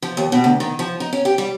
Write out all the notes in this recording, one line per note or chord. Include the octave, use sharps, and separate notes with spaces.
F3
D#2
B2
D2
D#3
F3
D#4
C#4
G4
G3